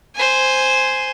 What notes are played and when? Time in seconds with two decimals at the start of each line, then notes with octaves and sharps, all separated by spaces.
0.15 C5 G#5